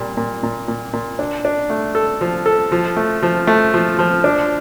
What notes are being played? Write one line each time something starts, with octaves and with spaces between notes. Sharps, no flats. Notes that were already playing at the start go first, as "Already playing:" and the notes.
Already playing: A#2 G3
A#2
A#2
A#2
A#2
D4
D4
A3
A4
F3
A4
F3
A3
F3
A3
F3
F3
D4